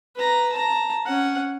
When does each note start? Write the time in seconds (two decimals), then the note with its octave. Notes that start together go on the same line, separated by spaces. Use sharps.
0.16 B4 A#5
0.52 A5 A#5
1.06 C#4 F#5